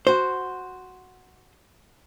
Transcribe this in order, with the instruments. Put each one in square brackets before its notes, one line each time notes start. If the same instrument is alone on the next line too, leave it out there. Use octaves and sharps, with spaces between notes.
[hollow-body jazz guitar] F#4 C5